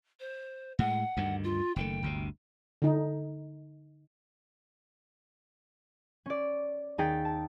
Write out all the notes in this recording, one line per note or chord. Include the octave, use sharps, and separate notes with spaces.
C5
A2 G#3 F#5
D2 G2 D#3
F4
F#1 D#3 A3 G5
G1 D2 C3
D3 D#4
C#4 D5
D#2 D#4 G#4 G5 A6 B6
A5